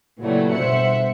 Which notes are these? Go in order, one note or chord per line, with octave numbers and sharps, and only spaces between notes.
A#2 C#3 E3 F#3 G3 A3
G1 B2 C5 E5 F#5 C#7